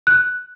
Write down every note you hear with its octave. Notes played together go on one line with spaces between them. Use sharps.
F#6